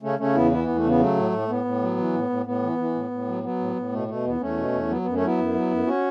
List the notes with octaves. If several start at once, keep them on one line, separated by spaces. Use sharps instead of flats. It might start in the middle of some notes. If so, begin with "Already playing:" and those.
C#3 A3 C#4
C#3 A3 C#4
E2 B3 E4
E3 B3 E4
E2 B3
A3
C#3 B3
F#3 A3
A2
A2
A2 B3
A2
F#3
E3
A2
A2
A2 B3
E3
E3
A2
A2
F#3
F#3 B3
A2
A2
B2 A3
B2 A3
E2 B3
E2 A3 C#4
B2
E2
F#3 B3
F#2 B3
A3 C#4
F#3 B3 E4
F#2
F#3
F#2
C#4 F#4